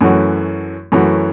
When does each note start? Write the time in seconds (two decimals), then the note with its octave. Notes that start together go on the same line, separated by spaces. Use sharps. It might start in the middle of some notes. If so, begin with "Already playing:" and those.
0.01 F#2 E3 A3 C#4 F#4
0.92 F#2 E3 A3 C#4 F#4